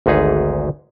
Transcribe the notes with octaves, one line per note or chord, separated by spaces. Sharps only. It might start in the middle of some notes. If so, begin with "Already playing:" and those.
G#1 D2 G#2 D#4 G#4 B4